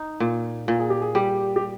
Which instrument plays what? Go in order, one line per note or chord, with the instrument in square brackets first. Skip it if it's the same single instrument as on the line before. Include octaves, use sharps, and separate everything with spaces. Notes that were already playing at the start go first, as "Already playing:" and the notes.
Already playing: [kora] D#4
A#2
A#2
[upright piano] G#4
G4
G#4
[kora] G3 [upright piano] G4
[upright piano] G4